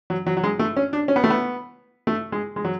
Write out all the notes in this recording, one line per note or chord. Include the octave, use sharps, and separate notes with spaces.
F#3
F#3
F#3
G#3
A3
C#4
D4
C#4
B3
A3
B3
A3
G#3
G#3
F#3